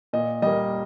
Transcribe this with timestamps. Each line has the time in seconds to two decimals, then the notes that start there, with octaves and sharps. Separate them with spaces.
0.13 A#2 D#5
0.42 G3 A#3 D#5